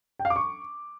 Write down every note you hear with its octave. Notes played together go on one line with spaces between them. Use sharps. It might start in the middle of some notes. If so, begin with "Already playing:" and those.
G5
F5
D6
C#6